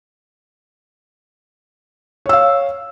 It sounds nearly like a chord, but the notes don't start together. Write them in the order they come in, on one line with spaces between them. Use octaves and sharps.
C#5 E6 F5